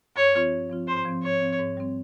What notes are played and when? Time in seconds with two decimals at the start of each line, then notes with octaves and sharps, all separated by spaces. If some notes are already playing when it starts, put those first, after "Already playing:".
0.16 G2 C#5
0.34 F3 C4 F4
0.51 G2
0.69 F3 C4 F4
0.88 G#2 C5
1.05 F3 C4
1.23 G#2 C#5
1.41 F3 C4
1.59 G#2
1.77 G3 C4